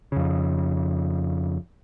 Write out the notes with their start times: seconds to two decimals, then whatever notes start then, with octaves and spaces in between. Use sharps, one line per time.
0.12 F2 C#3